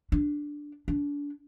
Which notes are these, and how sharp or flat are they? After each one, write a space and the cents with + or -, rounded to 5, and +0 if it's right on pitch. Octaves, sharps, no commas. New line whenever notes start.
D4 +0
D4 -30